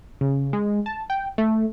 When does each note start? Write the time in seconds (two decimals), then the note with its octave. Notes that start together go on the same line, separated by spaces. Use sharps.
0.21 C#3
0.53 G#3
0.86 A5
1.10 G5
1.38 A3